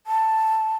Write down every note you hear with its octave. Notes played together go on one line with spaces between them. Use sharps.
A5